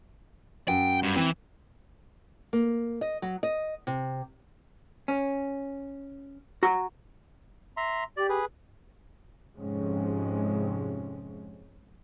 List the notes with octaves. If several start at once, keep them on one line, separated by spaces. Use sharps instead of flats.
F#2 G5
G2
E3 C4
A#3
D#5
F#3
D#5
C3
C#4
F#4 A#5
E5 A#5 C6
G4 D5
G#4 B4
F2 G#2 C3 G#3 C#4